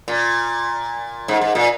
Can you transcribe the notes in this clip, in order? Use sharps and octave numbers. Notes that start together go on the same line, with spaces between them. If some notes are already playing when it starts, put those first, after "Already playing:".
A#2
G#2
G#2
A#2